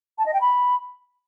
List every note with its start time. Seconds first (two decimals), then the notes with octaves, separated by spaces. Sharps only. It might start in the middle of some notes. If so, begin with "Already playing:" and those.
0.18 A5
0.26 D#5
0.33 G5
0.41 B5